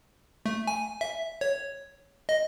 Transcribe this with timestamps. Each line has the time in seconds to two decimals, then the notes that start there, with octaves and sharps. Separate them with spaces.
0.46 A3
0.67 G#5
1.01 E5
1.41 C#5
2.29 D#5